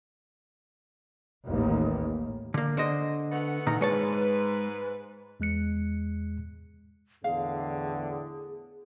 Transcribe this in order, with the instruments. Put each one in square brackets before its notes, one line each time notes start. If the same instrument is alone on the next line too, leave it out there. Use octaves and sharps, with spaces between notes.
[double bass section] A1 D#2
[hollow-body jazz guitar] D3 A#3
D3 C5 D#5
[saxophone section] A3 B3 F#5
[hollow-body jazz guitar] A#2 D#3 A#5
[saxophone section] G#2 B4 [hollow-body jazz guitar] G#3 C#5 A5
[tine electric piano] E2 G#3 F#6 C#7
[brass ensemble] E2 A2 D3 [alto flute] G#4 [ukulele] F5